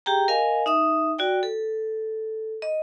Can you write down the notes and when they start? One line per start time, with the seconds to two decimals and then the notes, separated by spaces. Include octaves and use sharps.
0.06 G4 G#4 G5 A#5
0.28 A#4 D#5 F5 G#5
0.66 D#4 E5 D#6
1.18 F#4 D5 G5
1.43 A4
2.62 D#5